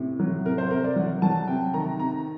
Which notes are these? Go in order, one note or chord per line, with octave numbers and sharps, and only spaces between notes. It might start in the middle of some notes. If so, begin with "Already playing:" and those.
Already playing: A2 C3
F#3
C3 A#4
C5
C3 A#4
D5
F#3 F#5
F#3 A5
C3 G5
D#3 A#5
C3 A#5